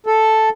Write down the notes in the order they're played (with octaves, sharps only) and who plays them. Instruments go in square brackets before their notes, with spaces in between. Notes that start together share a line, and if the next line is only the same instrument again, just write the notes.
[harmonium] A4